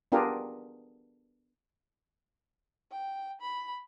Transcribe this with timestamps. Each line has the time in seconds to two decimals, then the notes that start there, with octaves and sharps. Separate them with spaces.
0.12 B3 D4 F4 G4 G#4 A#4
2.91 G5
3.41 B5